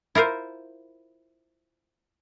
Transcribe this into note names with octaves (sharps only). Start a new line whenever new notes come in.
E4 F4 A#4 C5